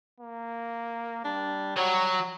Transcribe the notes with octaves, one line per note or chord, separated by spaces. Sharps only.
A#3
G3 D4
F#3 C#5